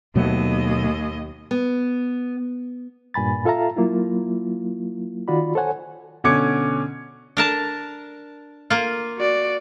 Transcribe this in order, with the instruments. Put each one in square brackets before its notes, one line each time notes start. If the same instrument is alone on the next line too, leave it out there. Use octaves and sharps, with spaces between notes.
[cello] D#2 D#5 [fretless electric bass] B2 F#3 A3
[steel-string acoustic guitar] B3
[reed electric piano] G2 A#2 G#5 B5 A6
F4 A4 E5 F5 A5 A#5
F#3 A#3 E4 F4
D#3 F4 F#4 D5 B5
A4 C5 C#5 F#5 G#5
[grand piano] B2 D3 C#4 D6 G#6 C#7
[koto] D4 A#4 A5
A#3 F4
[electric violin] F#4 D5